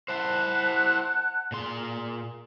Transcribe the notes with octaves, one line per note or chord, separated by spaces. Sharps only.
E4 C5 F#5 A5 F#6
A#2 G#4 C6